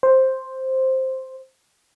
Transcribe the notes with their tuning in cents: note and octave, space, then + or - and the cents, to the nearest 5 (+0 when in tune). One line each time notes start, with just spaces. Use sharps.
C5 +5